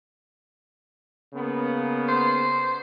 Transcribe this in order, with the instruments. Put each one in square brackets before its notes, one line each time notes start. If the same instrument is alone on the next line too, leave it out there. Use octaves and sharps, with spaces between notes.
[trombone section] C#3 A#3 B3
[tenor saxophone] C5